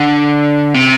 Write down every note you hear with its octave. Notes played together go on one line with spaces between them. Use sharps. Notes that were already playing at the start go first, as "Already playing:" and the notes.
Already playing: D3
C3